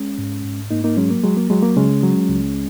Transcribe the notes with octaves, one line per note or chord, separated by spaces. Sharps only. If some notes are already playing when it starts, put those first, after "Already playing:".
Already playing: G#3 C#4
G#2
G#2
G#2 A#3 D#4
A#3 D#4
F#3 G#3 C#4
A#3
F#3 G#3
A#3
F#3 G#3
A#3
C#3 G#3 C#4
F#3
C#2